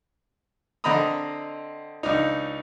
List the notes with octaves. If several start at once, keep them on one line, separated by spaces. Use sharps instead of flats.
D3 C4 D#5 A#5 B5 D#6
C#2 D4 D#4